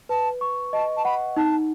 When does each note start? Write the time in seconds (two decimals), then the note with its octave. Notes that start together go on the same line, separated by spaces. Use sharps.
0.09 B4 A5
0.41 C#6
0.73 D#5 A5
0.96 A5
1.05 F#5 B5
1.36 D#4 A5